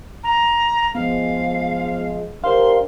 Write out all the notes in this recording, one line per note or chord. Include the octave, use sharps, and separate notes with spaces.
A#5
F3 G#3 B3 F5
D4 G4 A#4 C5 F5 C6